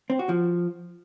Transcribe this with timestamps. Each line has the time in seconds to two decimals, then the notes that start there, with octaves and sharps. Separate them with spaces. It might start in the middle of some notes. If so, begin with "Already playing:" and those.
0.10 C4
0.19 F#4
0.29 F3